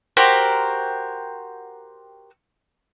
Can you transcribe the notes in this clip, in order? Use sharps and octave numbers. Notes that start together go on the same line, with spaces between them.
F#4 G4 A#4 C5